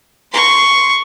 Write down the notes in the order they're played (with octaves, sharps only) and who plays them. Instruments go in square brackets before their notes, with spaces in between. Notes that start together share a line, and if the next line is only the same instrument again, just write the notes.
[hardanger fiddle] C6 C#6